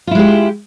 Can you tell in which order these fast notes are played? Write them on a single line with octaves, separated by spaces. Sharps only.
F4 E4 G#3 G4